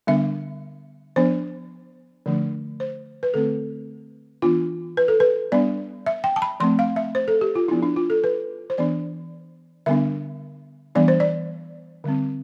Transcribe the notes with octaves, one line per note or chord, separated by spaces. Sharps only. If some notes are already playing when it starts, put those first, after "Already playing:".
D3 G3 B3 D4 E5
F3 B3 D4 C5
D3 F3 A3 D4
C5
B4
D3 A3 C4 A4
E3 B3 D4 F4
B4
A4
B4
G3 B3 D4 D5
E5
G5
A5
B5
F3 A3 C4 C6
F5
E5
C5
A4
G4
F4
F3 B3 D4 E4
D4
F4
A4
B4
C5
E3 B3 D4 D5
D3 G3 B3 D4 E5
E3 G3 B3 D4 D5
C5
D5
D3 G3 C4